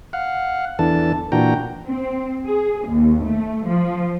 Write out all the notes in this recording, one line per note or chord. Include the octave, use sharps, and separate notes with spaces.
F5 F#5
E2 E3 D4 A4 A5
A#2 E3 D4 F#4 G5 A#5
C4
G#4
D#2
A3
F3